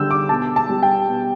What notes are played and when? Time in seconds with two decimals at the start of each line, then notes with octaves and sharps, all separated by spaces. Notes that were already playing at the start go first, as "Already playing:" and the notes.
Already playing: D3 G3 E6 G6
0.11 D6
0.29 B2 A5
0.56 A5
0.69 G3
0.83 G5
1.09 B2